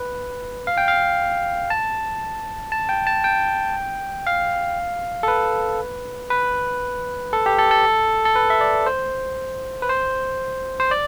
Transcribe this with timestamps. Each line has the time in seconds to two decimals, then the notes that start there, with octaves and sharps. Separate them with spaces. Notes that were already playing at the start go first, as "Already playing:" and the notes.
Already playing: B4
0.67 F5
0.77 G5
0.88 F5
1.70 A5
2.72 A5
2.89 G5
3.07 A5
3.24 G5
4.27 F5
5.23 A4
5.28 B4
6.30 B4
7.33 A4
7.46 G4
7.59 A4
7.71 A4
8.25 A4
8.36 B4
8.50 E5
8.61 D5
8.86 C5
9.82 B4
9.89 C5
10.80 C5
10.91 D5